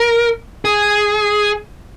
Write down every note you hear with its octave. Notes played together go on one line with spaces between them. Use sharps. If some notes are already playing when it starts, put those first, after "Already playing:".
Already playing: A#4
G#4